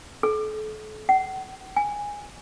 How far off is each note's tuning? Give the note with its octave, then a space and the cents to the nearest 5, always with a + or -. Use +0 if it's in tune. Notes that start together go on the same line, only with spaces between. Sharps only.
A4 -40
F#5 +40
G#5 -10